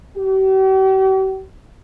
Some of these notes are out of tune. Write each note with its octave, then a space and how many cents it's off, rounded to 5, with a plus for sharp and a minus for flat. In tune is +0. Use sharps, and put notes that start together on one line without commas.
G4 -45